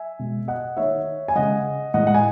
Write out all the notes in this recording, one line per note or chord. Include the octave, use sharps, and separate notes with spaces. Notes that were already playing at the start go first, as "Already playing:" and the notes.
Already playing: E5 G#5
B2 G#3
D#5 F#5
D#3 A3 C#5 E5
G#5
C#3 G#3 D#5 F#5
A2 G#3 D#5 F#5
F#5
G#5